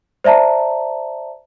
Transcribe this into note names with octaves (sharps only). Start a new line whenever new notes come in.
C5 D5 E5 A5 A#5